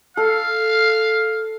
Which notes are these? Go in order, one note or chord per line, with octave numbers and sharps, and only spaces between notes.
A4 F5